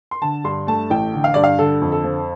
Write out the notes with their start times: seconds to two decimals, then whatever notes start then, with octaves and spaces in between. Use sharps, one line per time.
0.11 C6
0.22 D3 A5
0.44 G2 C6
0.67 A3 A5
0.90 A1 G5
1.13 D3
1.24 F5
1.34 G2 D5
1.44 F5
1.59 D3 A4
1.82 F2
1.92 A4
2.04 F3